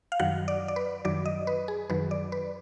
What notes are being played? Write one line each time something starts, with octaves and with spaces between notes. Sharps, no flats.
F5
F#2 D#3 F#3 F#5
D5
D5
B4
F#2 D#3 F#3 D5
D#5
B4
G#4
F#2 D#3 F#3 B4
D5
B4